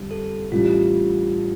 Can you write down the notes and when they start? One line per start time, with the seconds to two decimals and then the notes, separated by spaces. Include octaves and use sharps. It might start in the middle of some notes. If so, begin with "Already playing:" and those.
Already playing: F2 D3 G3
0.11 A4
0.51 A1 A2 G3 D4 F4 G4